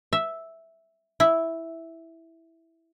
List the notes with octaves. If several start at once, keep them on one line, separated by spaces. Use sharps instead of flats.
E5
E4